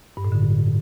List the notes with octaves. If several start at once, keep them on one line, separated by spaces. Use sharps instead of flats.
G2
A2
D3